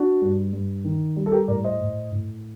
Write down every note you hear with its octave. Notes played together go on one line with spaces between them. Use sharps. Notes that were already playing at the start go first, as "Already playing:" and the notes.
Already playing: D4 F#4
G2
G2
D#3
G3
A4
G4 A#4
A2 A#4 D5
C5 D#5
A2
A2